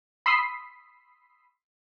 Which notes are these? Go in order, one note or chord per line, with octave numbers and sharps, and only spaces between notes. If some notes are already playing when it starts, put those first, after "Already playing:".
B5 C6 D#6 E6 B6 C7